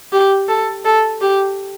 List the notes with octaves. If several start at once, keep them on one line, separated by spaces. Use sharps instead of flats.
G4
A4
A4
G4